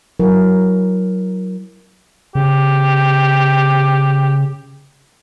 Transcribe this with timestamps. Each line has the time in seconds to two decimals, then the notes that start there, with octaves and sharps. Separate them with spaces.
0.20 F#3 E4 A#4
2.35 C#3 G4